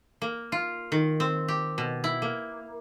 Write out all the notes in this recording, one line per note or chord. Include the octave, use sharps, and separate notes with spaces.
A#3
F4
D#3
C4
G4
B2
E4
A#3